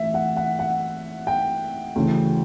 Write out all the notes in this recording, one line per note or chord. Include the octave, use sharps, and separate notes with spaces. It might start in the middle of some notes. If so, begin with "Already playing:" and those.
Already playing: A1 E3 E5
F#5
F#5
F#5
G5
D2 C#3 E3